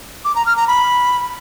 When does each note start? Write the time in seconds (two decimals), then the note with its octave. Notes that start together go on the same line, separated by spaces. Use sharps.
0.25 D6
0.35 A#5
0.46 F6
0.57 A#5
0.68 B5